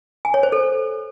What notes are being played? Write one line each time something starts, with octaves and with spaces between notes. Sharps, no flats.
G#5
C#5
C5
A4